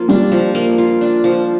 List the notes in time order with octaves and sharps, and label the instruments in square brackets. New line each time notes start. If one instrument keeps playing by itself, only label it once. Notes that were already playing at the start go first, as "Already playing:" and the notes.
Already playing: [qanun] F3 A#3 F4
[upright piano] G3 [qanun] D4
[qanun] F3
A#3
F4
D4
F3